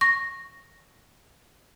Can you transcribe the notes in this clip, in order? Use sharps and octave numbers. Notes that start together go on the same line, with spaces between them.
C#6 A#6